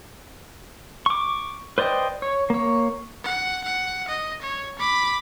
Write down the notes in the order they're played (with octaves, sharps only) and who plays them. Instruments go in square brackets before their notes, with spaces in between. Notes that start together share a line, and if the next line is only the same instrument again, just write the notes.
[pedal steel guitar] C#6 D6
B4 C5 D5 D#5 G5
C#5
A#3 C#5
[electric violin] F#5
F#5
D#5
C#5
B5 D6